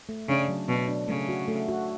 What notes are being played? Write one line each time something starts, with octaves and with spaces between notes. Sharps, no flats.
A3
C#3 D4
F#3
B2 F#3
D4
C#3 A3
F#4
A3
F#4